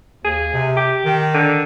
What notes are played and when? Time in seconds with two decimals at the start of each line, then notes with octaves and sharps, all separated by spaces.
0.25 D#2 G#4
0.53 C3
0.77 G4
1.05 D#3
1.34 D3